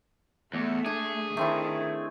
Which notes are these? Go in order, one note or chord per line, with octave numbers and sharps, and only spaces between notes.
E2 A3
D4 G#4
D#3 A3 C4 E4